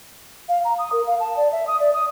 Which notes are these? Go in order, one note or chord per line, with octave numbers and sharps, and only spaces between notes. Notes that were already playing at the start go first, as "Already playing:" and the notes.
F5
A#5
D#6
A#4
F5
A5
D5
E5
D#6
D5
D#6